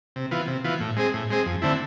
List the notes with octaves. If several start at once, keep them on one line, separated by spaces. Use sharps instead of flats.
C3
E3 B3 F4
C3
E3 B3 F4
A2
G#3 C4 G#4
A2
G#3 C4 G#4
F2
D3 A3 C4 E4